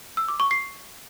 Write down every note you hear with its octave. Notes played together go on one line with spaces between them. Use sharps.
E6
D6
C#6
C7